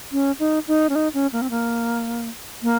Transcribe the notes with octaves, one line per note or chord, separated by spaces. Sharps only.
C#4
D#4
D#4
C#4
D#4
C#4
A#3
C4
A#3
A#3